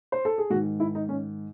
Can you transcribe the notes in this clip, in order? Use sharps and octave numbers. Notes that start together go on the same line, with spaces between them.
C5
A4
G#4
G#2 D#3 F#4
E4
D#4
C#4